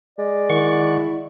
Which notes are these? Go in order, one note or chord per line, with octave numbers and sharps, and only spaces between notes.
G#3 D5
D#3 E4 F#5 C#6